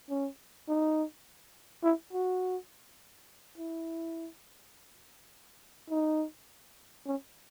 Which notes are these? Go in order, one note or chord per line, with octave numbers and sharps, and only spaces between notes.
C#4
D#4
E4
F#4
E4
D#4
C#4